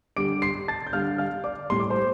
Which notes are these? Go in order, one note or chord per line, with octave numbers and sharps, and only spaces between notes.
D3 G3 D6 D7
C6 C7
A5 A6
G6
D3 G3 F5 F6
F5 F6
D5 D6
A2 G3 C6
D6
C5 C6